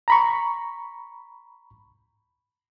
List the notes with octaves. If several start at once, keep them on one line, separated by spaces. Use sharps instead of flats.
A#5 B5 C#6